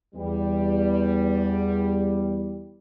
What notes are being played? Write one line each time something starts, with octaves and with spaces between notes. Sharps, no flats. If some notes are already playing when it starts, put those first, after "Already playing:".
E2 G3